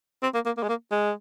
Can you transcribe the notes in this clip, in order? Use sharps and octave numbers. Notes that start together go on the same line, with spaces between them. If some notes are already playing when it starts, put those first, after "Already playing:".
C4
A#3
A#3
A#3
G#3
A#3
G#3